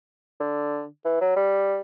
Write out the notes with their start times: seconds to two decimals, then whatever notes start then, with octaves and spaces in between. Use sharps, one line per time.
0.40 D3
1.05 E3
1.21 F#3
1.36 G3